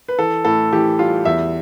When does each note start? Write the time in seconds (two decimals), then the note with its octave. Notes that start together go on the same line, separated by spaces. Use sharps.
0.08 B4
0.18 E3 A4
0.45 A2 A4
0.73 E3 G4
0.99 G3 F4
1.25 E2 E5